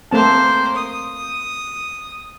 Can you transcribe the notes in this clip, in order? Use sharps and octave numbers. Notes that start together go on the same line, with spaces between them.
A3 A#3 C4 C5 A5
D#6